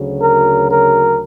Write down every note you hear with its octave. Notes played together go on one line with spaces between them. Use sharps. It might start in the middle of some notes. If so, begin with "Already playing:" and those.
Already playing: D2 C#3 F#3
A#4
A#4